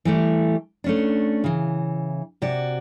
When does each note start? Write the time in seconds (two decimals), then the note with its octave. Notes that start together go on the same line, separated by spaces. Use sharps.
0.05 E3 G3 A3
0.84 A3 C#4 D4
1.44 C#3 E3
2.42 C3 F#4 D5